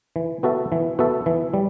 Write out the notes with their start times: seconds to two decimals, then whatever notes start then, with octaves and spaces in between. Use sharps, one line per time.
0.16 E3
0.43 B3 F#4 A4 E5
0.72 E3
0.99 B3 F#4 A4 E5
1.26 E3
1.54 G3